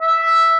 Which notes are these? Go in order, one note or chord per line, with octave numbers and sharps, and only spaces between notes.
E5